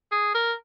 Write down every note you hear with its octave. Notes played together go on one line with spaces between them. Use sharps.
G#4
A#4